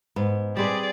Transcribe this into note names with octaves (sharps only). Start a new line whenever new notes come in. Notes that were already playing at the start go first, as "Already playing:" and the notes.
G#2 B3
G3 C4 G#4 B4 D5